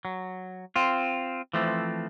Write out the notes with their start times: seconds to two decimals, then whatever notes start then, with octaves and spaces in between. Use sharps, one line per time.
0.05 F#3
0.76 C4 F4
1.53 E3 F3 A3 C4